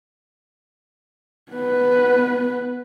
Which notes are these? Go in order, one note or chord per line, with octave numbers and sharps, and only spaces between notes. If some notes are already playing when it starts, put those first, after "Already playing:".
B3 B4